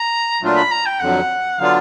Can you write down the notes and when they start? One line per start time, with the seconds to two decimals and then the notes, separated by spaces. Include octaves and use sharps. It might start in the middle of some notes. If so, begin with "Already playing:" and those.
Already playing: A#5
0.42 A#2 F#3 A3 D4 F4
0.56 B5
0.71 A#5
0.86 G5
1.00 F2 D3 F#3 F#5
1.59 D3 F#3 B3 D4 F4 F5